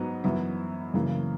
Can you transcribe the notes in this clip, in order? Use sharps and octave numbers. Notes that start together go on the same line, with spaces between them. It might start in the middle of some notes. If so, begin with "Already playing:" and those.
Already playing: G#2 F#3 B3 D#4
F#2 E3 B3 E4
F#2 C#3 E3 A#3